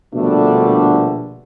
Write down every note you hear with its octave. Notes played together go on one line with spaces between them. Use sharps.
A#1 B2 D3 G3 A3 D4